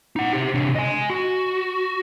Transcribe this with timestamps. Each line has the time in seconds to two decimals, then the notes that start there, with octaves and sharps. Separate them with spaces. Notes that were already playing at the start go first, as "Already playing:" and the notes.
0.16 D#4 F#5
0.33 G4 C5
0.54 C3 D4
0.76 D#5 G#5
1.10 F#4